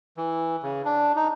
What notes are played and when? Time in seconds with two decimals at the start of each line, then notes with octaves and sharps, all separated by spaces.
0.17 E3
0.63 C#3
0.85 D4
1.16 D#4